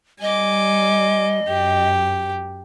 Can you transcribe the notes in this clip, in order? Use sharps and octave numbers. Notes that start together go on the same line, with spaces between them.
G3 D#5 G#5 D6
F#2 G4